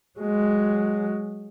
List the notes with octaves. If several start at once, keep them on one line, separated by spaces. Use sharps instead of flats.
F#3 G#3